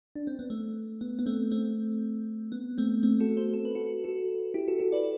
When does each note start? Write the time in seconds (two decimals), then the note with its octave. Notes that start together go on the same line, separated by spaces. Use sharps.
0.16 D4
0.27 C4
0.39 B3
0.50 A3
1.01 B3
1.19 B3
1.26 A3 C4
1.51 A3 C4
2.52 B3
2.78 A3 C4
3.03 A3 C4
3.20 F#4 A4
3.37 A4 C5
3.54 A4
3.65 B4
3.75 F#4 A4
4.04 F#4 A4
4.54 E4 G4
4.68 F#4 A4
4.80 F#4 A4
4.92 B4 D5